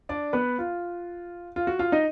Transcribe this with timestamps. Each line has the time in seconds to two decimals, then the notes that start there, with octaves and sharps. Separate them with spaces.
0.09 D4 D5
0.33 B3 B4
0.59 F4
1.56 F4
1.67 F#4
1.79 F4 F5
1.92 D#4 D#5